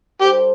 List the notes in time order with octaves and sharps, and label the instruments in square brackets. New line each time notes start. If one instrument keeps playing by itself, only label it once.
[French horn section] G3 D4 A4 C5 [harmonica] G4